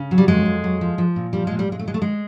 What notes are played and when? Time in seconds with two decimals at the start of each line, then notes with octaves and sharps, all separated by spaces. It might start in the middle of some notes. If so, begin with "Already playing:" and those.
Already playing: C#3
0.11 F#3
0.18 G3
0.28 F2 G#3
0.46 F2
0.64 F#3
0.81 F3
0.98 F3
1.16 A#2
1.33 F3 G3
1.47 G#3
1.51 A#2
1.59 G3
1.68 A#2 G#3
1.79 A3
1.86 D#3 G#3
1.94 A3
2.02 G#3